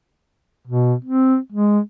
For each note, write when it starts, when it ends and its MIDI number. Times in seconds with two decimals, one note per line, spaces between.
0.67 0.94 47
1.04 1.37 60
1.52 1.79 56